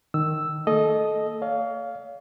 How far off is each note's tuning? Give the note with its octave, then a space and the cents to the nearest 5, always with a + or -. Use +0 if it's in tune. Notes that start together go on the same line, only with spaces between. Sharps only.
D#3 -10 E6 +0
A#3 -40 A4 -25 D#5 +0
C#5 +40 F5 +0